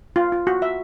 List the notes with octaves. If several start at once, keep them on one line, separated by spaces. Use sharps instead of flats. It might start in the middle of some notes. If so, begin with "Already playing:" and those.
F4
F4
F#4
E5